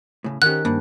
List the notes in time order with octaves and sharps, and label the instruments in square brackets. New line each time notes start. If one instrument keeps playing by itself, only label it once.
[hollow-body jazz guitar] A2 C#3
[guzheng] D#3 C#4 [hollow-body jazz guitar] G4 A#4 F#5 [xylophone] F#6
[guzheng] G2 [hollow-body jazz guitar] A#3